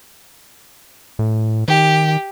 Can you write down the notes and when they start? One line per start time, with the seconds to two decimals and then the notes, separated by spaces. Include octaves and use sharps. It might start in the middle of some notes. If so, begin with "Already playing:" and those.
1.19 A2
1.68 D#3 G4